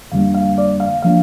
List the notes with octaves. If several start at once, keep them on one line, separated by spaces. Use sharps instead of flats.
F2 D3 G3 A#3 D4 F5
F5
D5
F5
F3 A#3 D4 F5